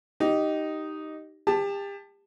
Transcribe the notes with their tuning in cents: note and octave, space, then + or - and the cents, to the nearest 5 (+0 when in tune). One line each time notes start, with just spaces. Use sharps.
D#4 +0 G4 -15
G4 +35 A5 +0